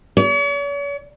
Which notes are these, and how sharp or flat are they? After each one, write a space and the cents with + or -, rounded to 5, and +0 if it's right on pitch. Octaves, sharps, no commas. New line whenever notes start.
C#5 +45